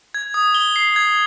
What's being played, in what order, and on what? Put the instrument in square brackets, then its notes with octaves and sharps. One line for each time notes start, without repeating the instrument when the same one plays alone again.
[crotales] G#6
D#6
G7
C7
G#6